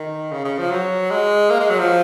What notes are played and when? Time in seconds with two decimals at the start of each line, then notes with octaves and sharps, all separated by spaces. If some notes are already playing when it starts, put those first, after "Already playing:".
Already playing: D#3
0.31 C#3
0.45 C#3
0.58 F3
0.71 F#3
1.10 G#3
1.50 A#3
1.60 G#3
1.70 F#3
1.79 F3